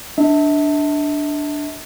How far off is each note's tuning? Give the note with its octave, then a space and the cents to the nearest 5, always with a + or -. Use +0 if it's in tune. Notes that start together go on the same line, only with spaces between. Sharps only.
D4 +0 E5 -40